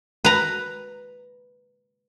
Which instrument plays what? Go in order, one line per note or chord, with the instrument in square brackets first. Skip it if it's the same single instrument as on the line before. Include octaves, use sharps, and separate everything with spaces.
[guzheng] B4 A#5